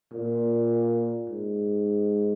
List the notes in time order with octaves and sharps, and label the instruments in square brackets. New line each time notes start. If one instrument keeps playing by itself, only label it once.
[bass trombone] A#2
G#2